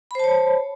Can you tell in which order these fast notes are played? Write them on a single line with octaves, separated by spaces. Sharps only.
B5 C5 A5 C#5